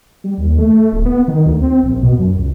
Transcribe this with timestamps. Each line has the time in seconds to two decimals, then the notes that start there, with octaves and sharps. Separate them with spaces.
0.24 G3
0.38 D#2
0.59 A3
0.92 D1
1.05 B3
1.28 D#3
1.46 D2
1.62 C4
1.83 A#1
2.03 B2
2.18 F#2
2.36 C#2